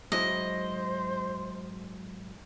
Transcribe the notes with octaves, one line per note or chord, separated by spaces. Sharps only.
G#2 F#3 E4 C5 D#5